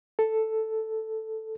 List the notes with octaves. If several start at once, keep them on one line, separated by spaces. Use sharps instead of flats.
A4